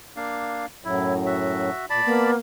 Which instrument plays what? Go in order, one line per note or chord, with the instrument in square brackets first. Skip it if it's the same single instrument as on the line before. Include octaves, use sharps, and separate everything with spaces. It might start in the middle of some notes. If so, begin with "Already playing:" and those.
[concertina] A#3 D4 F5
[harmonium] F#2 A2 F#3 [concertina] E4
[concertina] F#4 E5
[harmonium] A#2 [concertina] D5 A5 B5
[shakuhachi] A#3 [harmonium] B3